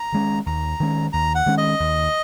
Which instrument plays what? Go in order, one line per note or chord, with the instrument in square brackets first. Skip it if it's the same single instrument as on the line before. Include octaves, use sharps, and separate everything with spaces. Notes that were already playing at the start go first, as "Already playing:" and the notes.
Already playing: [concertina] A#5
[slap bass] D#3 G#3 C#4
[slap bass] D#2 [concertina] A#5
[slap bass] D#3 G#3 C#4
[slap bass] D#2 [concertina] A#5
[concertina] F#5
[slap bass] D#3 G#3 C#4
[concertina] D#5
[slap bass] D#2